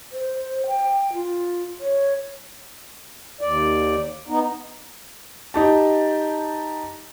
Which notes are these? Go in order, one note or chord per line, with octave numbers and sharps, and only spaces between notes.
C5
G5
F4
C#5
D#2 D5
B3 D#4
D#4 G4 A5